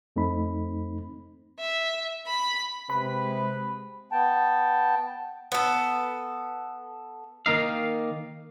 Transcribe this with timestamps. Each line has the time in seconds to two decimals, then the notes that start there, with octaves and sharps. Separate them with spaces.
0.16 F2 A3 C4 D#4 B5
1.60 E5
2.27 B5
2.90 C3 G#3 B4 B5
4.12 B3 G5 A5
5.52 B3 A4
7.46 D#3 A#3 D#4 F5